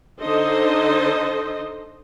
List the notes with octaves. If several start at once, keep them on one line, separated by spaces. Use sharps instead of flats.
D3 D#4 A4 C5 D#5